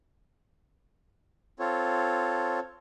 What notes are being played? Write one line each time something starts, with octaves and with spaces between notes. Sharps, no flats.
C4 F4 A4 C#5